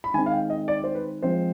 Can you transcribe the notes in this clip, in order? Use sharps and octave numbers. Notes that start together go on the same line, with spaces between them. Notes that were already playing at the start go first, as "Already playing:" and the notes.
B5
D#3 G#3 C4 G#5
F5
G5
D#5
D5
C5
B4
F3 G#3 C4 C5